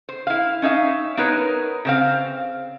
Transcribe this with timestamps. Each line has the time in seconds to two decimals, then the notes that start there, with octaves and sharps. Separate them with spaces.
0.09 C5
0.27 E4 F5
0.62 C#4 D#4 E5 F5
1.17 B3 D#4 A#4 B4 C#5
1.85 C#3 C4 F5